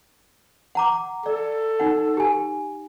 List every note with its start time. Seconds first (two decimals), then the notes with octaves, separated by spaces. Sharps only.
0.75 F#5 A#5 D6
1.26 A4 D5
1.80 D#4 F#5
2.17 G4 G#5